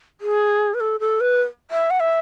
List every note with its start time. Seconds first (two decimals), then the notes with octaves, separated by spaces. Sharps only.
0.21 G#4
0.74 B4
0.80 A4
1.00 A4
1.21 B4
1.71 E5
1.90 F#5
2.00 E5